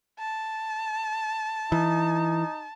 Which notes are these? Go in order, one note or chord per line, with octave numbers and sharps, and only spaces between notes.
A5
E3 D#4